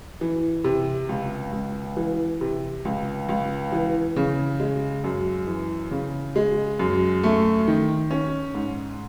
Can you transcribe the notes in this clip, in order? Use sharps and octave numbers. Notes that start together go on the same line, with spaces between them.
E3
C3
C#2
C#2
E3
C3
C#2
C#2
E3
C#3
G#3
F#2
E3
C#3
G#3
F#2
A3
D#3
C#4
G#2